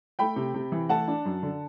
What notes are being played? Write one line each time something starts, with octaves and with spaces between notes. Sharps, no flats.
A3 G5 B5
C3
C3
E3
A3 F#5 A5
D4
F#2
D3